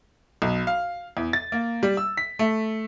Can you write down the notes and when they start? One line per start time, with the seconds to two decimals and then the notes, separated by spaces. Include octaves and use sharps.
0.42 B1
0.67 F5
1.17 E2
1.33 A6
1.52 A#3
1.83 G3
1.97 E6
2.17 B6
2.39 A3